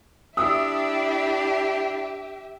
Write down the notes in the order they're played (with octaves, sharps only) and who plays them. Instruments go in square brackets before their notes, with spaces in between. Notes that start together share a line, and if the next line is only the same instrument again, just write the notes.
[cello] D4 E4 [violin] G4 E5 [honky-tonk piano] D#6 E6